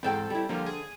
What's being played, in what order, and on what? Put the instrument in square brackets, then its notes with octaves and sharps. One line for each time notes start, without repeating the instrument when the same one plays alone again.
[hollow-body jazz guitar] E2 G#2 G5 [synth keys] C4 A4
[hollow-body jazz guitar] G3 E4
[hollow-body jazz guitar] D3 [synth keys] F3 G3 A#3
[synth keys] G#4